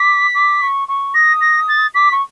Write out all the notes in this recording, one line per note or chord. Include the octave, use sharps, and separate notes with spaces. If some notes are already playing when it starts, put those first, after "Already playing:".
Already playing: D6 B6
D6
C#6
C#6
D#6 A#6
A#6
A6
D6 B6
C#6